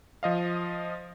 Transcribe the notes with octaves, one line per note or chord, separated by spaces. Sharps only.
F3 D#5 F5